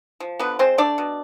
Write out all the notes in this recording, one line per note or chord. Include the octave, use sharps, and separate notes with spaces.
F3
D3 B3 B4
G#3 C4 C5
A3 D4 D5
B2